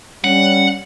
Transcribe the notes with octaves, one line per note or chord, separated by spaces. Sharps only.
G3 C#4 F#5